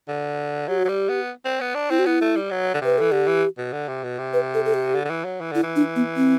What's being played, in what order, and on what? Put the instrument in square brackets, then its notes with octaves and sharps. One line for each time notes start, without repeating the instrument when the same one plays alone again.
[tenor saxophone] D3
[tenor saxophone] F#3 [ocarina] G4
[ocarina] F#4
[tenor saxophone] F#3
[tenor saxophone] G3 [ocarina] G4
[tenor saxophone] B3
C4
B3
D4
[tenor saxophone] C4 [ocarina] E4
[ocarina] F#4
[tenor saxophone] B3 [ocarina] E4
[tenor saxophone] A3
G3
F#3
D3
[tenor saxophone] C3 [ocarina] B4
[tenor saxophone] E3 [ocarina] A4
[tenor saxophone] D3 [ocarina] G4
[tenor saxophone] E3
B2
D3
C3
B2
C3
[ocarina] B4
A4
A4
G4
[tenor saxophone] D3
D3
E3
F#3
E3
[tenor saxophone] D3 [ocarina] E4
[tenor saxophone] E3
[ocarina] D4
B3
C4